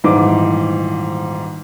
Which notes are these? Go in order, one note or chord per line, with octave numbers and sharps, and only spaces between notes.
D#1 G#2 E3 D6